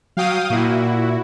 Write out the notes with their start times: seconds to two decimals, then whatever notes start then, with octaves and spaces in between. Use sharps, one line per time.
0.17 F#3 F5 G5 D#6
0.50 A#2 E4 F#4